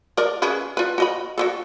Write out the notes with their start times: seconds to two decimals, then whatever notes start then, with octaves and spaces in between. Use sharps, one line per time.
0.17 A#4 D5
0.42 C#4 G#4 B4
0.77 F4 B4
0.98 F#4 D#5 B5
1.38 F#4 G4 A4